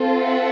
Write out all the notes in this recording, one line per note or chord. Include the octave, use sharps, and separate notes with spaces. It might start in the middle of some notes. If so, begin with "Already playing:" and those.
Already playing: C4 F4 A4
E5 F#5